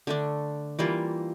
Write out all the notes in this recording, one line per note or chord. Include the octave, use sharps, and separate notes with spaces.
D3 A3 D4
E3 G3 A#3 F4